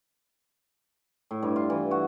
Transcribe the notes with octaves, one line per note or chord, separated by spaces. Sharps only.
A2
G2
F4
E3
F#4